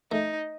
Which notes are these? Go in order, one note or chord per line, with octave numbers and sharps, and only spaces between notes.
A3 D#4